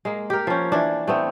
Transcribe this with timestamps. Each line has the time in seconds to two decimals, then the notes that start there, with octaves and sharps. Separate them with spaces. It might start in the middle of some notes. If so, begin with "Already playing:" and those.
0.05 G#3 A#3
0.30 G4 A#4
0.47 F3 C#4
0.72 E3 D4
1.07 A3 B3 C4